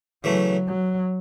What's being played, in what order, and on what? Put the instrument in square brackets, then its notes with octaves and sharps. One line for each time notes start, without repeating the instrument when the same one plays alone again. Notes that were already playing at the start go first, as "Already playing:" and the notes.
[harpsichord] C#3 E3 A3 [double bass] F#3
[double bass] F#3